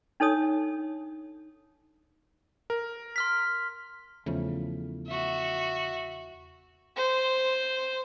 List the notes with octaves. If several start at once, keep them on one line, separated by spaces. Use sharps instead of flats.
D4 D#4 A4 C#5 D#6
A#4
C6 F6 B6
E2 C#3 F3 A3
F#4 E5
C5